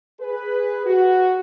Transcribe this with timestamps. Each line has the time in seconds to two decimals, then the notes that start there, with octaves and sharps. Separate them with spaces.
0.20 G#4 B4
0.86 F#4